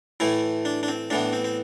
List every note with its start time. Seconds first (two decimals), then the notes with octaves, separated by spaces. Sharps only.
0.20 A2 E3 A3 E4
0.65 D4
0.83 D4
0.88 C4
1.10 A2 E3 B3 D4
1.33 C4
1.44 C4